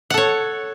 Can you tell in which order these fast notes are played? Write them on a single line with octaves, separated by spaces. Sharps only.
F#5 A4 C#5